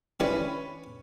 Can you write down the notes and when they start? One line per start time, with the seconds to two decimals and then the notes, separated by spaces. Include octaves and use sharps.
0.20 E3 G3 C4 C#4 B4